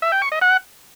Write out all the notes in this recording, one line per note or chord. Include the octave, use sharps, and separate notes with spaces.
E5
G5
C#6
D#5
F#5